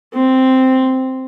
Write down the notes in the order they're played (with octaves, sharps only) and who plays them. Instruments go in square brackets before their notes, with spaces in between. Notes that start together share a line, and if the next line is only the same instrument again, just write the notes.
[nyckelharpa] C4